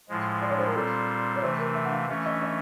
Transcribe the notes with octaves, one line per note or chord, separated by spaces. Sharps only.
A2 F3 G#3
D5
C#5
C5
A#4
A#2 G3 C4 A4
C#5
C3 E3 A3 C5
A#4
E5
F#5
F5
E3 A3 C#4 E5
D#5
D#5